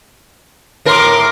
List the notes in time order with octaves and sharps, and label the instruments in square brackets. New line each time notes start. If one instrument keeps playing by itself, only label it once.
[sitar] A2 A#4 [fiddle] C6 D6